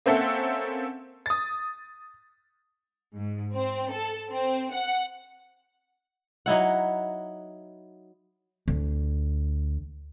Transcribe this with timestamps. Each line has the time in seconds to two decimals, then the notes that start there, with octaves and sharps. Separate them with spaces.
0.06 A#3 C4 C#4 A4 E5 F#5
1.26 D#6 A6
3.16 G#2
3.54 C4
3.91 A4
4.30 C4
4.72 F#5
6.46 F#3 D#4 E4 F#5
8.68 D2